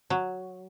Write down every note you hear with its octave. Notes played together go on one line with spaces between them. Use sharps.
F#3